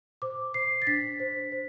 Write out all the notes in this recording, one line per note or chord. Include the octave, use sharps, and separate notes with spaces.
C5 D6
C5 C7
A6
D4 B6
C5
C5